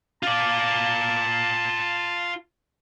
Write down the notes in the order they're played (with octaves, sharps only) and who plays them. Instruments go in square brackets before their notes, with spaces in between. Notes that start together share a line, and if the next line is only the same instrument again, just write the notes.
[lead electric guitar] F4 D5 [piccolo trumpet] A5